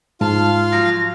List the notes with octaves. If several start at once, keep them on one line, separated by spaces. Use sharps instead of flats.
G#2 F4 F5 A5
F3 F#3 A#6